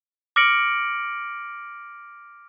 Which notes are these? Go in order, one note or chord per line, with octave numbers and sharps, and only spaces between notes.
D6 F6 A#6 C#7 D7 F#7